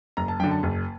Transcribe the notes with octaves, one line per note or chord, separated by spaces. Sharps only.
F#1 A#5
A5
F#2 D3 G5
A5
F#1